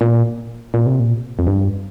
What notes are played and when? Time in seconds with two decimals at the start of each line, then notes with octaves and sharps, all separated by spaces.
0.01 A#2
0.74 A#2
0.86 C3
1.00 A#2
1.39 F2
1.47 G2